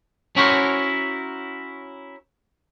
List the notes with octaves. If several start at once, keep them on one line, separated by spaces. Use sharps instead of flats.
C#4 E4 F#4 A#4 C5 C#5